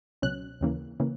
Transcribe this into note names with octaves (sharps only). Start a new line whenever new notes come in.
C#2 B2 F#3 C#4 F#6
D#2 C#3 E3 A#3
C#3 E3 A#3